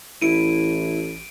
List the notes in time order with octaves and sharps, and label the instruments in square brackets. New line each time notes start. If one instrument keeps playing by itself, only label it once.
[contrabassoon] A1 [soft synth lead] E4 [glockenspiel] D7 D#7